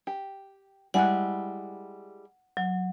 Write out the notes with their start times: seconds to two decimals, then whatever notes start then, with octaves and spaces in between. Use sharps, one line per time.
0.07 G4
0.94 G3 G#3 E4 F#5 F#6
2.57 F#3